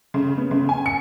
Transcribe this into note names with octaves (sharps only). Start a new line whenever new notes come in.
C#3
B3
C#3
G#5
C#7